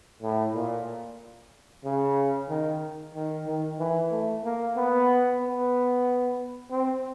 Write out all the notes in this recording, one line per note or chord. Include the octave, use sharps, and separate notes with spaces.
A2
A#2
C#3
D#3
D#3
D#3
E3
A3
A#3
B3
B3
C4